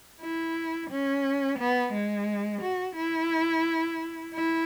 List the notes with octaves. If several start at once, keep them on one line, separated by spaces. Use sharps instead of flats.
E4
C#4
B3
G#3
F#4
E4
E4